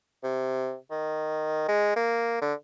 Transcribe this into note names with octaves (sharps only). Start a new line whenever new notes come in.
C3
D#3
G#3
A#3
D3